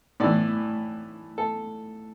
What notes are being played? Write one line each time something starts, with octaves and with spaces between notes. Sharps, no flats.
A2 E3 D5
A4